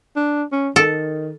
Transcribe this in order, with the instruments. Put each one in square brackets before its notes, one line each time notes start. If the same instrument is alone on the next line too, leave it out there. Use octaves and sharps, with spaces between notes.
[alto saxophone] D4
C#4
[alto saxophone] D#3 [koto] A4